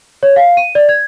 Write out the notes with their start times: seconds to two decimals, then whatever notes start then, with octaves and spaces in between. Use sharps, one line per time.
0.23 C#5
0.36 F5
0.57 D#7
0.75 D5
0.89 G#6